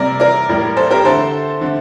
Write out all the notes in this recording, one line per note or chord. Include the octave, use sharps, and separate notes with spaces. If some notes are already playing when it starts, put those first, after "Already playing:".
Already playing: C3 G3 A#3 A#4 D5
A#4 D5
A2 G3 A#3
A4 C5
G4 A#4
D3 A3 A4 C5
D3 A3